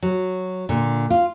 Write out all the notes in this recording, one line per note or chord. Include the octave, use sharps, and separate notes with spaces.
F#3
A#2 D3
F4